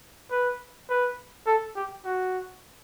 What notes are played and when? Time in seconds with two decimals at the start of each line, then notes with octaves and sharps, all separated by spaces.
0.31 B4
0.89 B4
1.47 A4
1.76 G4
2.05 F#4